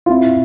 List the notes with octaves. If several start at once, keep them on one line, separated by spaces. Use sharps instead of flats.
F4
C4 E4